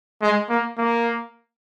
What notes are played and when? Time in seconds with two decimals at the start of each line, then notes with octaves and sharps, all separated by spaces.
0.22 G#3
0.50 A#3
0.78 A#3